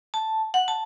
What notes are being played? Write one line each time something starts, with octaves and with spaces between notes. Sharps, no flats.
A5
F#5
A5